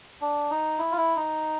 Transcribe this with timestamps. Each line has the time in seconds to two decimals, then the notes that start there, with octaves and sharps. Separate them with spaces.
0.21 D4
0.51 D#4
0.79 E4
0.92 F4
0.97 E4
1.16 D#4